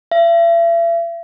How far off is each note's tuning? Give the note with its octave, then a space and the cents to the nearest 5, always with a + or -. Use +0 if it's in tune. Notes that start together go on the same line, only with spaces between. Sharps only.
E5 +40